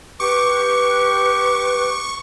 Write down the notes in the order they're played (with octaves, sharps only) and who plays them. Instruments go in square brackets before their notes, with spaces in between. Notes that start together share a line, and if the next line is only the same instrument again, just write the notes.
[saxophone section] G4 [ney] B4 [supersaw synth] C#6 [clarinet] D6